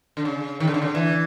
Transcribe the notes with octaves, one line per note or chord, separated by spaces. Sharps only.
D3
C#3
D#3
D3
C#3
D3
E3